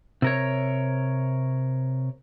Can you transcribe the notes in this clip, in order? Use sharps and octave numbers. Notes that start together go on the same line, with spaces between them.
C3 A#4 C#5